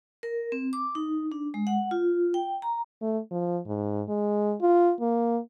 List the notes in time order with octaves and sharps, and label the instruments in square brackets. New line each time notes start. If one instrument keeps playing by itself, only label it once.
[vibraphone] A#4
C4
D6
D#4
D4
G#3
F#5
F4
G5
A#5
[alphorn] A3
F3
G#2
G#3
F4
A#3